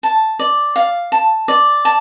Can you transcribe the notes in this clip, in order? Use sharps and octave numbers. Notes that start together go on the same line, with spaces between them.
A5
D5
F5
A5
D5
A5